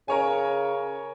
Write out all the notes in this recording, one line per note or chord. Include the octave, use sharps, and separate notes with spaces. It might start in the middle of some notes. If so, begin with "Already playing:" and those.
C#3 A#4 C#5 G#5